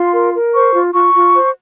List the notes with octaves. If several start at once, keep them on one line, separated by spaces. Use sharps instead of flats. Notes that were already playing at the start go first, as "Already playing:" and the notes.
Already playing: F4 C6
A#4
A#4
C5 C#6
F4
F4 C#6
F4
C5